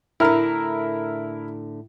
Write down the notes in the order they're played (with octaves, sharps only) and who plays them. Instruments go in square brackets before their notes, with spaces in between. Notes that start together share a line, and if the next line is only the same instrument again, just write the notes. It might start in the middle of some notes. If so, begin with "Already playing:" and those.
[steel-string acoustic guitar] A2 D3 [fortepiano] E4 A#4 F6